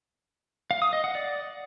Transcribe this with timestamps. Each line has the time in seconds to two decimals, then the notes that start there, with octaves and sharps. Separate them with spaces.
0.71 F5
0.82 D#6
0.93 D#5
1.04 F#5
1.15 D5